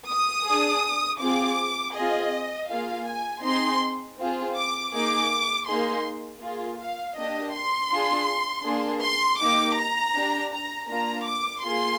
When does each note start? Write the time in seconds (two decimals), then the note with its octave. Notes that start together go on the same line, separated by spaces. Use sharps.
0.10 D#6
0.47 D4 G#4
1.21 C4 F4 G#4 D6
1.96 C4 F4 G#4 D#5
2.70 A#3 F4 G#4 F5
3.07 G#5
3.45 C4 D#4 G#4 C6
4.19 C4 F4 G#4
4.56 D6
4.93 A#3 D#4 G#4 D6
5.68 A#3 D#4 G#4 C6
6.42 A#3 F4 G#4
6.79 F5
7.17 A#3 D4 G4 D#5
7.54 C6
7.91 D4 F4 G#4
8.65 A#3 D4 G#4
9.03 C6
9.40 A#3 D#4 G4 D6
9.77 A#5
10.15 D4 G4
10.52 A#5
10.89 A#3 D4 F4 A#5
11.26 D6
11.63 A#3 F4 G#4 C6